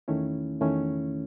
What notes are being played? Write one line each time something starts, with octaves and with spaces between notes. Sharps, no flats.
E2 D#3 A3 C#4 E4
E2 D#3 A3 C#4 E4